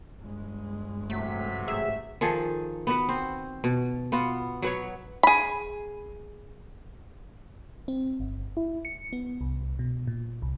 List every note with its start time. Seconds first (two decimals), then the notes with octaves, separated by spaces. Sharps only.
0.19 G1 G#3
1.10 A1 C3 F#3 A3 B6
1.68 G#2 A3 G#4 E5
2.21 D#3 F3 G#4 A4
2.87 B3 F#4 B4
3.09 C4
3.64 B2
4.12 B3 F4 F#4
4.62 F#3 B4 C#5
5.23 G#4 B5
7.88 C4
8.20 G1
8.57 E4
8.85 C#7
9.13 B3
9.41 C2
9.79 B2
10.07 A#2
10.42 C2